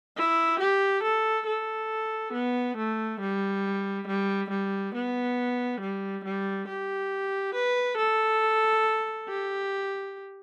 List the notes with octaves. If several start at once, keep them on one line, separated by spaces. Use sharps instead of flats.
E4
G4
A4
A4
B3
A3
G3
G3
G3
B3
G3
G3
G4
B4
A4
G4